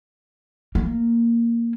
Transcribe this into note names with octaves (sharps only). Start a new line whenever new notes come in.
A#3